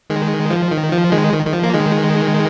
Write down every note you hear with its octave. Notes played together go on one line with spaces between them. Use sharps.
D#3 G#3
F3
D#3
F3
D#3 G#3
D#3
D#3
F3
A#3
D#3 G#3